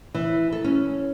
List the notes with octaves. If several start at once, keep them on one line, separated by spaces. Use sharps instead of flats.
E3
A4
C#4